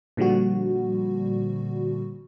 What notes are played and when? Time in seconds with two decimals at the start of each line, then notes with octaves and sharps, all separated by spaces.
0.17 A#2 D3 F3 G3 F#4